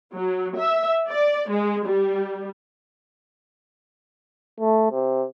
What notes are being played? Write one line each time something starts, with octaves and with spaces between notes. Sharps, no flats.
F#3
E5
D5
G#3
G3
A3
C3